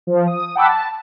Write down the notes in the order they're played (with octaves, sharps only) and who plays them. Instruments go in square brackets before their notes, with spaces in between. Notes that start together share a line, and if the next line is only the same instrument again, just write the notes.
[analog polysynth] F3
D#6
F#5 G5 A5 B5 D6 E6
A5